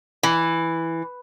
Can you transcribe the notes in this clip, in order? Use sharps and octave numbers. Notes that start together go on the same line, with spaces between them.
E3